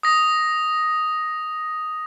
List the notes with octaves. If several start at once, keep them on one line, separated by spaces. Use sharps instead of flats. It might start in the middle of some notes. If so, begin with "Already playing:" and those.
D#6 A#6